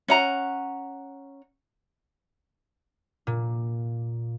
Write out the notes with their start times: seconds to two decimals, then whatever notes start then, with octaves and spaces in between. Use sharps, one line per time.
0.08 C#4 F#5 A#5
3.27 A#2